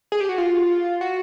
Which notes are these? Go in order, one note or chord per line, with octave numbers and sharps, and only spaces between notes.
G#4
G4
F#4
F4
F#4